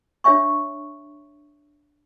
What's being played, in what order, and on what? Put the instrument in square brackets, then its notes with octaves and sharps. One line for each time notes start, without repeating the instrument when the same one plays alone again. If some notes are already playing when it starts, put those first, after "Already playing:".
[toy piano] D4 G4 C#5 E5 G#5 C#6